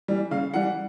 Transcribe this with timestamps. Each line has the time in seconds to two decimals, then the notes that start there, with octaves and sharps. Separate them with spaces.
0.08 E3 G3
0.31 C#3 F5
0.54 E3 G3 F#5